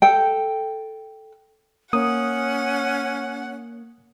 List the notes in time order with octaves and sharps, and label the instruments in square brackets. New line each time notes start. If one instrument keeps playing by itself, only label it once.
[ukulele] A4 G5
[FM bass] A#3 [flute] C#4 [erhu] F#5 [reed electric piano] D#6